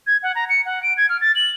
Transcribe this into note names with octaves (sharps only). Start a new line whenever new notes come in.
G#6
F#5
A#5
C#7
F#5
D7
G#6
F6
A6
F#7